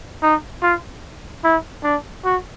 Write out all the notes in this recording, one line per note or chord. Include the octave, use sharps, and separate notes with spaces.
D#4
F4
E4
D4
F#4